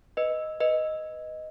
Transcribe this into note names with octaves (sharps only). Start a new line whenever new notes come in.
B4 D#5
B4 D#5